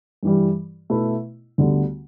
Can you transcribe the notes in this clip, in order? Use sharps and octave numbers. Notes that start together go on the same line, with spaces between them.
G2 E3 G3
B2 A3 E4 B4
D2 D3 G3 B3